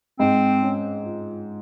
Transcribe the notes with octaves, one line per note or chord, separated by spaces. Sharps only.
G#2 C4
C#4
F4